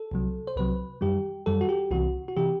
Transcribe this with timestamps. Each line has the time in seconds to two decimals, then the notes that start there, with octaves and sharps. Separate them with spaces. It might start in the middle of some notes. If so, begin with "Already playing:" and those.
Already playing: A4
0.11 C2 C3 F#3
0.47 C5
0.56 C2 C3 F#3 B4
1.01 F#2 D#3 G3 G4
1.46 F#2 D#3 G3 A4
1.61 F#4
1.69 G4
1.91 C2 C3 E3 F#4
2.28 F#4
2.36 C3 E3 G4